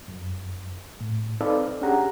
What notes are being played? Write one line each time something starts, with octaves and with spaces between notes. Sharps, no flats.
F#2
A2
C4 D#4 A4 B4 D5 F5
C#4 D4 G4 G#4 F#5 A#5